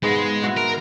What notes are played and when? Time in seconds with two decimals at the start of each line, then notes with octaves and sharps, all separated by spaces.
0.03 G#2 G#3 B3 F4
0.42 E4 F#4 F#5
0.57 A#4